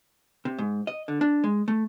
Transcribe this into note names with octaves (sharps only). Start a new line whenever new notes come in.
C3
G#2
D#5
D3
D4
G#3
A3